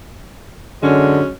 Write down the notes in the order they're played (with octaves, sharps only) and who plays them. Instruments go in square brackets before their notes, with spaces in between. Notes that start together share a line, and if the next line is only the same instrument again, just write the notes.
[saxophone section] F#2 G#3 C#4 [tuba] D3